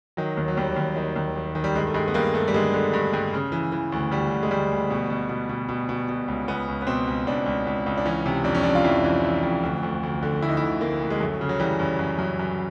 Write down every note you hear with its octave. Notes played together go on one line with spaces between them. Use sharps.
D#3 F#3
D#2
F#3
D#2 G3
D#2
D#3
D#2
D#3
D#3
G3
G2 G#3
A3
G2 G#3
B3
G2 A#3
G2 A3
G3
D3 G#3
D3
G2
G2
C#3
E3
E3
D2
D2 G3
D2
G#3
D2 G3
D2
B2
B2
B2
B2
B2
B2
B2
C#2
C#2 B3
C#2
B3
B2 C4
C#2
C#2 D4
C#2
C#2
C#2
D4
E3 C#4
C3
F2 D4
C#4
F2 D4
F4
F2 E4
E3
E3
F2
D2
D2
D2
D3
D2 E4
D#4
E4
D2
D2 A#3
D2
G#3
F#2 A3
C#3
F#3
E3 G3
F#2
F#2
F#2
F#2